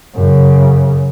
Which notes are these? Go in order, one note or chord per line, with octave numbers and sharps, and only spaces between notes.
F#2 C#3